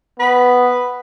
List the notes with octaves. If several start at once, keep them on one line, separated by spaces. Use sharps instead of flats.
B3 B4